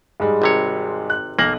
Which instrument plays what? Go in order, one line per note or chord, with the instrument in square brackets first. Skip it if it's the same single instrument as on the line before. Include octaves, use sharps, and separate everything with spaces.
[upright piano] G#2 G3 G#3
[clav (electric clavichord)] G#1 C3 C#5
[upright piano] F#6
[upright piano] B1 A#6 F#7 [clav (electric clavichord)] A#3